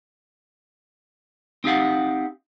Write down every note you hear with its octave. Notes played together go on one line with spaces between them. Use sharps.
C4 D#4 G4 F5 F#5